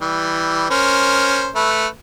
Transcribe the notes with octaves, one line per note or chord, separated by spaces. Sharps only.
E3 G3
C#4 A#4 C5
A3 B4